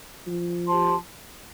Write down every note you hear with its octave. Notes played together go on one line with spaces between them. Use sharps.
F3
G4 C5 A5 C6